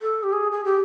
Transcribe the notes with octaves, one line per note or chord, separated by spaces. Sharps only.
A4
G4
G#4
G#4
G4